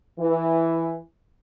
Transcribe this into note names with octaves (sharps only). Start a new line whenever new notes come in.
E3